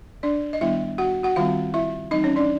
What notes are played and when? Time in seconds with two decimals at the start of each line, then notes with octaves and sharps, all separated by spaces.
0.23 D4 D5
0.53 D#5
0.61 D#3 G3 B3 D4 E4 E5
0.98 F#4 F#5
1.23 F#4 F#5
1.36 D#3 G3 C4 F4 F5
1.74 E4 E5
2.11 E3 G3 C4 D#4 D#5
2.24 C#4 C#5
2.36 D4 D5